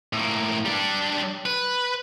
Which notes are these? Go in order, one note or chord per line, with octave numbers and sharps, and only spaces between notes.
A2 A#3
G3 D4
B4